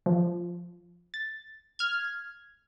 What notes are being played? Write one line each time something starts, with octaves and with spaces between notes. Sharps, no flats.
F3
A6
F6 G#6